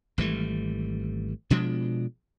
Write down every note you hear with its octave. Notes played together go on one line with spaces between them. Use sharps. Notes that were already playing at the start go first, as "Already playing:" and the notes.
G#1 E3 G3 A3
B2 F3 G#3 D4